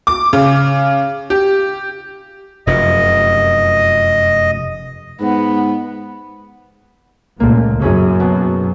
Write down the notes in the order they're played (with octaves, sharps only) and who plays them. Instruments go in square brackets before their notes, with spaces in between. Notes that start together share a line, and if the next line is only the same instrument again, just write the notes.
[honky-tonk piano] D6
C#3
G4
[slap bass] F1 F#2 [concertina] D#5
[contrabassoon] G#2 [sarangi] B3
[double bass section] C#2 A#2 [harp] A3 A#3
[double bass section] F#2 [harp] C#4 E4 G#4
[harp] B2